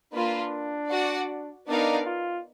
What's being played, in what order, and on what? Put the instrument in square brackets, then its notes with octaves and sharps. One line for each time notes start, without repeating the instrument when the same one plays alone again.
[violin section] A#3 F4 B4 [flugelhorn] D4
[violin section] F#4 D5 F#5
[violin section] B3 D#4 A#4 D5 F5 [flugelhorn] D4
[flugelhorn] F4